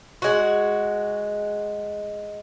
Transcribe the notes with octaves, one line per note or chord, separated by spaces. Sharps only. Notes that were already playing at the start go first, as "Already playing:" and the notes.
G#3 F#4